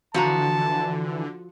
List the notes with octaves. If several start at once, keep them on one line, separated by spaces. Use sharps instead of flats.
D3 E3 F3 F#4 A5 A#5